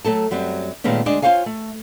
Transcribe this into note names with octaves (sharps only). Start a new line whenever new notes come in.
F#3 A3 A4 A5
F#2 F#3 G3 C4
A#2 D#3 G#3 A3 B3 C#4
D2 G#3 D4 D5 D#5 G#5
F4 F#4 C5 C#5 F5 G#5
A3